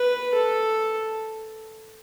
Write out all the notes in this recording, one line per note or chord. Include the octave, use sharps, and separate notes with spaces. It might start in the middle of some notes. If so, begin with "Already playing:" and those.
Already playing: B4
A4